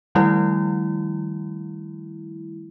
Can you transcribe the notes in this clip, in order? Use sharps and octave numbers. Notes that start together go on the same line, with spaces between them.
D#3 F3 G3 A3 E4